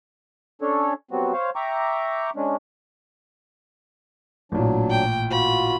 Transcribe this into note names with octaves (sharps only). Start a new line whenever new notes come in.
C#4 D4 A4 C#5
F#3 G3 B3 C4 F#4
C5 C#5 F5
E5 G5 A#5 C#6 D6
G#3 C#4 D4
A1 A#2 F#3 D4
G5
F4 F#4 B5